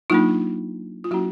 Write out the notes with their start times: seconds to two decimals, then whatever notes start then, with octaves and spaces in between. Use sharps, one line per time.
0.10 F#3 A#3 D4 D#4 F4
1.04 F4
1.11 F#3 A#3 C#4 E4 F#4